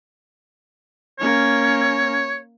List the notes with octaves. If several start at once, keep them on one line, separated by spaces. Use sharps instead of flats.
A#3 C#4 C#5